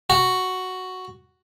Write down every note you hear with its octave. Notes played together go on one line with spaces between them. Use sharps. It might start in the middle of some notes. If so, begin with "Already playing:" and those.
F#4